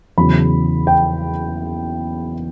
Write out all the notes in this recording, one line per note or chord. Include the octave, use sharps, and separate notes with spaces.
E2 C#3 F#3 B5
G5